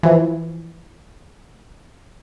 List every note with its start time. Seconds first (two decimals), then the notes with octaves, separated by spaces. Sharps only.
0.03 E3 F3